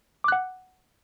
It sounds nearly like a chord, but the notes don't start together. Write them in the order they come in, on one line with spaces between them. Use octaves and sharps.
D6 F#6 F#5